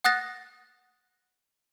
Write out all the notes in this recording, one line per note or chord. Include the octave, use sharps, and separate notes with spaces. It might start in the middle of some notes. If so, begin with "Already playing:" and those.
F#5 D#6 F#6 A6 A#6